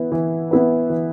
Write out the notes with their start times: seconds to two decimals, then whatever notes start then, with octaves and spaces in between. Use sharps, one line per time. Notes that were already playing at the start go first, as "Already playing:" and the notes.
Already playing: E3 B3 E4 B4
0.12 E3
0.51 B3 E4 B4
0.90 E3